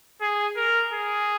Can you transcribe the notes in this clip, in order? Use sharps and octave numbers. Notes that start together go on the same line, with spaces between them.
G#4
A#4
G#4